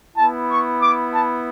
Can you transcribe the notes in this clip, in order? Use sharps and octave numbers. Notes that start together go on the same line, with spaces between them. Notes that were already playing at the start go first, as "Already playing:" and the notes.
B3 E4 A5
C#6
D6
A5